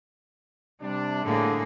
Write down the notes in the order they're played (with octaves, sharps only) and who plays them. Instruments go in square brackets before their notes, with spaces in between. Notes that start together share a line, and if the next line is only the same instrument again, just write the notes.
[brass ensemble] C3 D4 [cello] G3
[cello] A2 A#3 [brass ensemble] D3 G#4